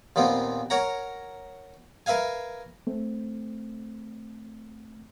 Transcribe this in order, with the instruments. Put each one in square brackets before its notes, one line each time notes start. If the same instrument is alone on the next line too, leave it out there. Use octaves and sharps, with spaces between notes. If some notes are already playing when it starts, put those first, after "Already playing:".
[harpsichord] D#2 A#2 B3 C4
A#4 C#5 F#5 A#5
A#4 B4 E5 F5 G#5
[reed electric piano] A3 C4